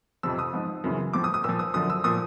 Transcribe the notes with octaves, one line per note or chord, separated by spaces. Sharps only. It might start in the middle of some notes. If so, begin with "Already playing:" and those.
F2 C3 F3 E6
D#6
G#2 F3
F#2 C#3 E3
A2 F3 D6
D#6
D#6
A#2 F3 E6
D#6
F#2 D3 F3 D#6
E6
A#2 F3 D#6